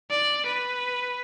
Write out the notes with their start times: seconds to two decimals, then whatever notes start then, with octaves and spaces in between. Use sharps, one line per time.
0.11 D5
0.46 B4